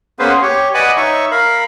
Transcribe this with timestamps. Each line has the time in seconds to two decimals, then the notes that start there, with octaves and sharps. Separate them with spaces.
0.19 A#3 B3 C#4 G#4 B4 C5
0.42 G4 C#5
0.74 B4 D5 D#5 F#5 G#5 B5
0.97 D#4 C#5 E5 C#6
1.31 A#4 F5 B5